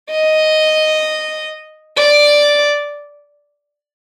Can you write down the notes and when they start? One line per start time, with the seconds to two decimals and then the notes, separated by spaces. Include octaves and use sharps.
0.11 D#5
1.97 D5